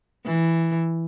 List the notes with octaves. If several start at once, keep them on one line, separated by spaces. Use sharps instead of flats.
E3